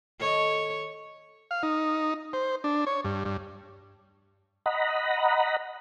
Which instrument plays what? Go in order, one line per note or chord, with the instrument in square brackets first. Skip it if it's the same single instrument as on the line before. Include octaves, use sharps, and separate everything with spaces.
[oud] D#3 A4 D#5 [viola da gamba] C#5
[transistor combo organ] F5
D#4
C5
D4
C#5
G2
G2
[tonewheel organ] D#5 F#5 A#5 B5